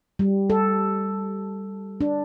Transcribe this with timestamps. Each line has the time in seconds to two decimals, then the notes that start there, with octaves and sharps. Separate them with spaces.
0.19 G3
0.50 A4
2.01 D4